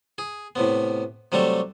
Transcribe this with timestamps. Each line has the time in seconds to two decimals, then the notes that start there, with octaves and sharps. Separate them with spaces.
0.18 G#4
0.56 A2 C3 B3
1.32 C3 F#3 G3 A3 A4